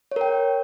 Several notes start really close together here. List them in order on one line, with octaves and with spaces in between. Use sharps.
C#5 A#4 G5